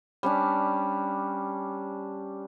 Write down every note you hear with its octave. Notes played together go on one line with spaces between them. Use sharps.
G3 C#4 D4